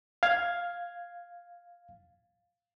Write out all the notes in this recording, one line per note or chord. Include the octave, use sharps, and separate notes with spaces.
F5 G#6